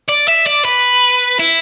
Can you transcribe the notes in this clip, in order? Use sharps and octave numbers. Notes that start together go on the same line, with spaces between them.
D5
E5
D5
B4
E4